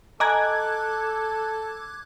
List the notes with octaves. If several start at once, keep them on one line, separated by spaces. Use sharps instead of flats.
A4 D#5 G#5 A#5 D6 F#6 G#6